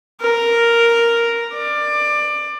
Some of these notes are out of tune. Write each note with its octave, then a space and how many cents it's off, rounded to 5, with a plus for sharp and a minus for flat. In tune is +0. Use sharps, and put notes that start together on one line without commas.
A#4 +0
D5 +20